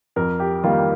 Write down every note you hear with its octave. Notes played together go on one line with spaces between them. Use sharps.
F2 A#4
G4
D#3 G3 A#3 F4